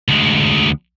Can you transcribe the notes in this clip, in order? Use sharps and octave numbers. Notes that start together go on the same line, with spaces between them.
D2 G#3